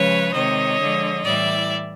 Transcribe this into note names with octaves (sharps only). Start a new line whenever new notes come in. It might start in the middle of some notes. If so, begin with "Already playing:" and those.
Already playing: C#3 F3 G#3 B4 C#5
C3 D#3 G#3 C#5 D#5
D3 F3 G#3
A2 E3 G3 D5 E5